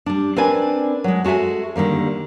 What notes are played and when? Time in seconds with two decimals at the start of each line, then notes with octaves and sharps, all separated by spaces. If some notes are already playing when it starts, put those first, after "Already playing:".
0.06 G3 D4
0.36 C4 D4 A#4 B4 D5 G#5
1.04 F#3 G#3
1.24 G#3 F#4 A4 E5 G#5
1.76 D3 D#3 G3 A#3